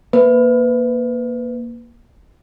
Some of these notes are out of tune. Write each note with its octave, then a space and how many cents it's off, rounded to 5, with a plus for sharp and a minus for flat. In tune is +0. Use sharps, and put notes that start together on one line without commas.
A#3 +15 B4 +20